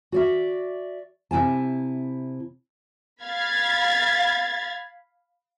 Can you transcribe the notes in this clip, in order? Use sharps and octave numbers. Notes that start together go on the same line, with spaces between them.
F#4 D5 E5
C3 E4 G#5 A5
F5 B5 G#6 A6